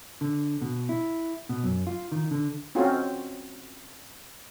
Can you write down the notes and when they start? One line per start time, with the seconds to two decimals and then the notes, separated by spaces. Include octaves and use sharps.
0.21 D3
0.62 B2
0.89 E4
1.49 B2
1.64 F#2
1.87 F4
2.12 D#3
2.31 D3
2.75 C4 C#4 D#4 F4 F#4 A4